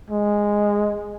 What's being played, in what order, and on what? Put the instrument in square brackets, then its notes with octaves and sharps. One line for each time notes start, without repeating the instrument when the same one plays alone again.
[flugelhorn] G#3